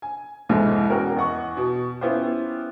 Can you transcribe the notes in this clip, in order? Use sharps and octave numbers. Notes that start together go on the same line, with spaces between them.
G#5
C2 F2 G#2 E3 G#3 A3
E1 C#4 F#4 A#4 G5
E2 D#5 F#5 C#6
B2
B3 C#4 E4 F4 G4 C5